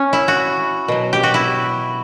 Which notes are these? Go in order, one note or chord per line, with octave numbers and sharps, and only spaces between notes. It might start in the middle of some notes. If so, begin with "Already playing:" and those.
Already playing: C#4
E4
F#4
B2 F#3
G4
F#4
E4